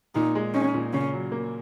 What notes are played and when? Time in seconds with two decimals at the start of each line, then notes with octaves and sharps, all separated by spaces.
0.15 A#2 D#4
0.35 G#3
0.54 C#4 D#4
0.74 A#2
0.93 C#3 C#4
1.13 F#3
1.32 A#3